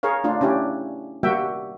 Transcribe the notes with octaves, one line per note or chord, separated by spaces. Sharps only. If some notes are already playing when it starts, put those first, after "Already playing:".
G#4 A#4 C#5 F5
A3 D4 F4
C#4 D4 E4 G4
G3 A#3 F#4 E5 G5